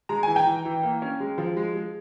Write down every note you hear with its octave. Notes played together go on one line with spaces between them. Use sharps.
G#3 A#5
E3 G#5
G5 A#5
E3
E3
A#3
C#4
G#3
F3
G#3
G#3